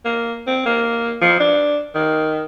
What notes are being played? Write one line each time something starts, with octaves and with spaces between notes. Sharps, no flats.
A#3
C4
A#3
F3
D4
D#3